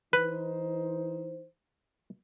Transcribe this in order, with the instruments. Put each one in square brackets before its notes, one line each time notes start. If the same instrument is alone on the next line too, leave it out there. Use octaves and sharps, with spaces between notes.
[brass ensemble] E3 D#4 C5 [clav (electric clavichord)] B4